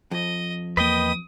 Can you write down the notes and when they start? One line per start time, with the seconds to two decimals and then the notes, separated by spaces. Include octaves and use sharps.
0.11 F2 D#5
0.77 E2 A#3 B4 D#5 G5 D#6